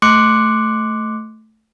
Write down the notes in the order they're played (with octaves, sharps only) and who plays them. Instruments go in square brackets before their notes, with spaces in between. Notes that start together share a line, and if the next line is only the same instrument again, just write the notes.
[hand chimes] A3 C6 D6 F#6 C#7